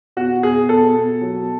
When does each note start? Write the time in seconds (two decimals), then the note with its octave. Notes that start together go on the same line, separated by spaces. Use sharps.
0.17 B2 F#4
0.43 B2 G#4
0.69 B2 A4
0.95 B2
1.21 F#3